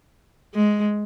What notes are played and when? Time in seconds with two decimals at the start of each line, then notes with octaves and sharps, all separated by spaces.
0.54 G#3